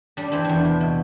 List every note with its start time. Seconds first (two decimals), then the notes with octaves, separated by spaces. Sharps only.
0.17 G3 D4
0.32 E3 C4
0.44 E2 D4
0.65 C3
0.81 B2